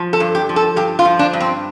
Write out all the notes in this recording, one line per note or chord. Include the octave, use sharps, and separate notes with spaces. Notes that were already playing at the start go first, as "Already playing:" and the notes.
Already playing: F3
A4
G2
G4
F3
A4
G2 G4
F4
F3
D4
G2
C4